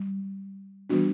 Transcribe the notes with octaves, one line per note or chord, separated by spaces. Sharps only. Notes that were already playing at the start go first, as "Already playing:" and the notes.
Already playing: G3
E3 G3 B3 D4 F#4